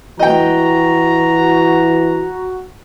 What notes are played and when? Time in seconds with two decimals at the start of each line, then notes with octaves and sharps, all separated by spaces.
0.19 E3 F#4 D#5 G5 A#5